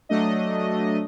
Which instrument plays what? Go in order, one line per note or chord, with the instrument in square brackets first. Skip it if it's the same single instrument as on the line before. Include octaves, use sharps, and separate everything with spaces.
[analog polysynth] F#3 A3 D4 D#5